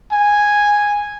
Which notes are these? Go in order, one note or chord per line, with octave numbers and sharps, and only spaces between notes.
G#5